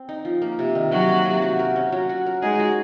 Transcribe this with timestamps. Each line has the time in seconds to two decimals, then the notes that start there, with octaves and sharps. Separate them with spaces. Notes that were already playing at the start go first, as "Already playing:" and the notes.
Already playing: C4
0.09 D#4
0.25 F3
0.42 A#3
0.59 C3
0.75 D#3
0.91 C3 F#3 F#4
1.09 A#3
1.26 C3
1.42 F#4
1.59 A#4
1.76 C#4
1.92 F#3
2.09 F#4
2.26 A#4
2.42 G#3 D#4 G#4
2.59 F#4